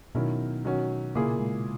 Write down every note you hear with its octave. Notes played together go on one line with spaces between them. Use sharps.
B2 D#3 F#3 C#4 E4 A#4
D#3 F#3 C#4 F#4
A#2 C#3 A#3 E4 G#4
G#3